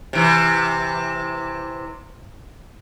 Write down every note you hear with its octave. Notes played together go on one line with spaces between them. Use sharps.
C3 E3